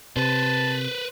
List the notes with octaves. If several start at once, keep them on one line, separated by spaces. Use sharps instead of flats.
C3 B4 C5 A5